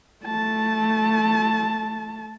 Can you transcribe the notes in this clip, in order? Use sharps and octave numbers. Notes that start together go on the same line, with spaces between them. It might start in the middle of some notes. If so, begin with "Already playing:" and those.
A3 A5